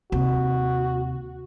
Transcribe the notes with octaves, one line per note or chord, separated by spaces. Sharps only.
D#2 C3 F#4